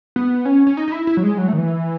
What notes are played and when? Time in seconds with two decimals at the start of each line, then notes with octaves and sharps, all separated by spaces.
0.16 B3
0.45 C#4
0.67 C#4
0.77 D#4
0.88 D#4
0.92 E4
1.07 E4
1.17 F#3
1.23 G#3
1.38 F#3
1.48 A3
1.53 D#3
1.58 E3